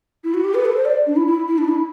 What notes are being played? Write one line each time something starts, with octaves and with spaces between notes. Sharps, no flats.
E4
F#4
G4
B4
A4
C5
D5
D4
E4
E4
E4
D4
E4